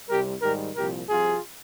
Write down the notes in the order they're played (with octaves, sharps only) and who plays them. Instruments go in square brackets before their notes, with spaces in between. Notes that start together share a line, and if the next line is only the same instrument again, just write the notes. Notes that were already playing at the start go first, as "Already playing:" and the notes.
[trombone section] C2 C3 G3 G4 A#4
G#2 D#3 G3 G4 A#4
C2 A#2 F3 G4 A#4
C2 C3 F3 F4 G#4